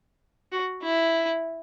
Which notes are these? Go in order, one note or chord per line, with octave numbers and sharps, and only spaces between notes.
F#4
E4